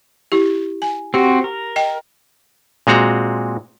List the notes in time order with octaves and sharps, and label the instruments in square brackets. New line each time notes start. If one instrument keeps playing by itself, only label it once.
[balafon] E4 G4
G#5
[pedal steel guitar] C4 F#4 [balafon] G4
[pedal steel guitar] A#4
[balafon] D#5 G5
[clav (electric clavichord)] A#2 G#3 C4 F#4 A#5